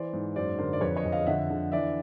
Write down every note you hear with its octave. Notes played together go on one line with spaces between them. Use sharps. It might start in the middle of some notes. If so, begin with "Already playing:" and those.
Already playing: E3 C5 D5
G#2
F#2 C5 D5
D3 A#4 C5
D5
F2 B4 C#5
C#5 D#5
F2
D#5 F5
D3 E5 F#5
D3
E3 D5 E5